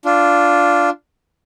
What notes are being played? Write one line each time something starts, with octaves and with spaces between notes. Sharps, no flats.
D4 F4